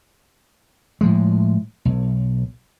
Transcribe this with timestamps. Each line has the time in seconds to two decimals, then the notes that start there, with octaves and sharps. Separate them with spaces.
1.01 A2 F3 G#3
1.85 B1